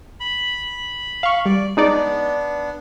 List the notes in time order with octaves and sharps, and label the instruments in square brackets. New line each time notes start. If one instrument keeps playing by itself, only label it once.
[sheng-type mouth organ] B5
[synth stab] F5 C#6
[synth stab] G3 [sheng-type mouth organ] D5
[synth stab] G#3 D#4 D5 [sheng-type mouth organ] B3 D4